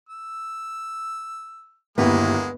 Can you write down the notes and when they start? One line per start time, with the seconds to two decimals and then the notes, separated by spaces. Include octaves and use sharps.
0.09 E6
1.98 G1 D#2 G#3 A#3 B3 E4